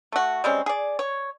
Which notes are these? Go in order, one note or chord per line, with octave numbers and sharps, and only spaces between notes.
A3 F#4
G3 G#3 C4 C#4
G#4 D5
C#5